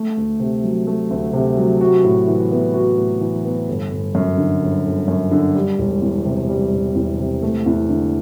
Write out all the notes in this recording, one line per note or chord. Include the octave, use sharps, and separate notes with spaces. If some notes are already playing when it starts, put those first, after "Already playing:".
Already playing: A3
D2
C3
F#3
A3
D2
C3
F#3
F#4
A2
E3
B3
F#4
A2
E3
B3
G1
G1
F#2
D3
G1
G1
F#2
D3
G3
E1
E2
C3
G3
E1
E2
C3
A3
E2
D3